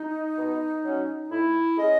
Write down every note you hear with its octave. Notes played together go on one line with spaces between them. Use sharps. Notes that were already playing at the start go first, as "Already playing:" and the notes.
Already playing: D#4
B2
F#3 C#4
A2 E4
G#3 C#4 D#5